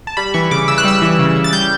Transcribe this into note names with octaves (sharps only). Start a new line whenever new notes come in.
A5
G3 B5
E3 C#6
C#3 D6
C#3 E6
F#6
G3 E6
E3
C#3
C#3
A6
G3 G6